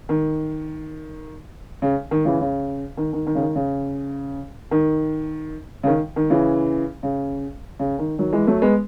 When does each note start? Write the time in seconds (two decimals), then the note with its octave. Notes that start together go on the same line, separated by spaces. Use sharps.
0.09 D#3
1.82 C#3
2.11 D#3
2.25 C#3 E3
2.41 C#3
2.97 D#3
3.13 D#3
3.27 D#3
3.35 C#3
3.41 D#3
3.55 C#3
4.71 D#3
5.83 C#3
5.87 D#3
6.16 D#3
6.30 C#3 E3
7.03 C#3
7.79 C#3
7.99 D#3
8.19 D#3 F#3
8.33 E3 G#3
8.47 F#3 A3
8.62 G#3 B3